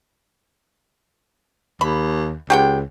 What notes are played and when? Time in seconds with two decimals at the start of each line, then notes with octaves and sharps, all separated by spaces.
1.81 D#2 B5
2.50 C#2 G4 F#5 G5